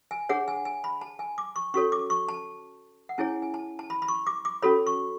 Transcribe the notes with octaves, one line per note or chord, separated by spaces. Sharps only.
G#5
D4 G#4 C#5 F#5
G#5
G#5
B5
A5
G#5
D6
C#6
C#4 F#4 A4 C#5 C#6
D6
C#6
A5
F#5
C#4 E4 G#4 C#5 G#5
G#5
A5
A5
B5
B5
C#6
D6
D6
C#4 F#4 A4 C#5 B5
C#6